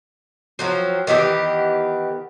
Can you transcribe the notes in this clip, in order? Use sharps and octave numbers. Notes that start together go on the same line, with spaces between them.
F3 F#3 C4
D#3 E3 B3 G4